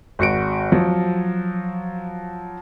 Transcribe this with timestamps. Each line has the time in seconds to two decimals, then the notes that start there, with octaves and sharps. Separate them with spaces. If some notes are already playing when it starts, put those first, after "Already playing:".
0.19 G#1 F#4 C#7 D7
0.72 F3 F#3